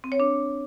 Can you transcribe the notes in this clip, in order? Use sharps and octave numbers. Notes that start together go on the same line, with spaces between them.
C4
C#5
D4